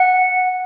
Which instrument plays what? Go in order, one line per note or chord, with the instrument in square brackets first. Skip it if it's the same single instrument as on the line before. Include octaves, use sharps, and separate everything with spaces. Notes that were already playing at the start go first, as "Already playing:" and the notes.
Already playing: [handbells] F#5